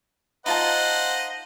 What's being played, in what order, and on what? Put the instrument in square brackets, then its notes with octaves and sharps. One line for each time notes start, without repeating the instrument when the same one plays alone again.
[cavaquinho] D#4 F4 A5 [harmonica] C5 D#5 F#5